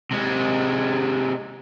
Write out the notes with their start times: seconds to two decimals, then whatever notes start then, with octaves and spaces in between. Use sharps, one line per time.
0.11 C3 G#3